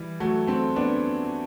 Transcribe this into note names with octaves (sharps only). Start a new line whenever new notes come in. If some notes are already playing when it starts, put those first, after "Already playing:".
Already playing: E3 G3
F#3 A3
A3 C4
B3 D4